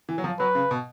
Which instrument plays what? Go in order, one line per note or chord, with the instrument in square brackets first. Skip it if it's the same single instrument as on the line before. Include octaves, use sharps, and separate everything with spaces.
[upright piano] E3
F#3
F3
[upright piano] F#3 [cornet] B4
[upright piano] C#3
B2